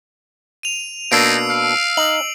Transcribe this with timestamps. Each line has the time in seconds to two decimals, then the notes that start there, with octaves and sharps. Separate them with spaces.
0.63 D#7 F7
1.12 B2 A#3 D4 D#4 E6 C7 D7
1.50 F5
1.97 D#4 F#7